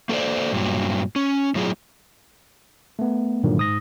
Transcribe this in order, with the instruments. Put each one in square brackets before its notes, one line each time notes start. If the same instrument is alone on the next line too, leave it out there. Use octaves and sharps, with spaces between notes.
[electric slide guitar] A#3 A4 A#4 C5 D5
G2 A#2 F#3
C#4
A2 F#3 F4 G#4
[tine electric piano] A3 B3
G2 A#2 D3 D#3 F#3
G#2 D#6 A#6